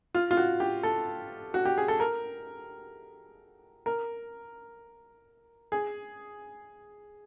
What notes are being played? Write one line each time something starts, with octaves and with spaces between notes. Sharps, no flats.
F4
F4
F#4
G4
A4
F#4
G4
G#4
A4
A#4
A#4
G#4